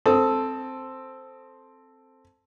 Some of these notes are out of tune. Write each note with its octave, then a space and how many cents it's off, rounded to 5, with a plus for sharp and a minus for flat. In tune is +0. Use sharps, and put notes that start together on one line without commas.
C4 +0 A4 +0 D#6 +25